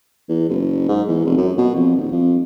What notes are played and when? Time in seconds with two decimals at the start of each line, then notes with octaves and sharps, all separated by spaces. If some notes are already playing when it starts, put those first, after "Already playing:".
0.29 E2
0.49 F#1
0.88 G#2
1.08 E2
1.25 F1
1.37 F#2
1.58 B2
1.75 F2
1.96 D#1
2.11 F2